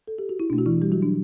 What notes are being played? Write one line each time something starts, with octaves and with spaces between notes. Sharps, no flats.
A4
G4
F#4
E4
B2 A3 D4
F#4
E3 E4
G3 G4
F#3 F#4
D4